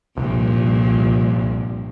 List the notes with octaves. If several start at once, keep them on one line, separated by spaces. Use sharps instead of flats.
C2 G2 A#2 F3